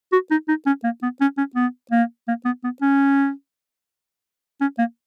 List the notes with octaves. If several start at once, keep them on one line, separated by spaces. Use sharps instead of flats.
F#4
D#4
D#4
C#4
A#3
B3
C#4
C#4
B3
A#3
A#3
B3
B3
C#4
C#4
A#3